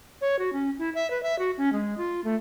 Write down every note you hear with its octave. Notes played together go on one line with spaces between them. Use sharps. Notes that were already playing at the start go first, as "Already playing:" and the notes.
C#5
F#4
C#4
E4
E5
B4
E5
F#4
C#4
G#3
F4
A3